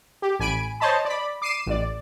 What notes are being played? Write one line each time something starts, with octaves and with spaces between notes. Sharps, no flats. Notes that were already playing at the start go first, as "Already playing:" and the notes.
G4
A1 G#5 B5 D7
C5 C#5 D#5 A5 B5
D5 B5
D6 C7 D#7 E7
A1 D5